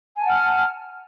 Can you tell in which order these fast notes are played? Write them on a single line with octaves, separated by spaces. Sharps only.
G#5 A5 F#5 F6